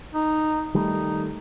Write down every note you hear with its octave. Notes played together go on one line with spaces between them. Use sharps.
D#4
D#3 G3 A3 D#4